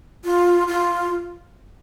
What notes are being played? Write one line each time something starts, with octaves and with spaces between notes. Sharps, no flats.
F4
F4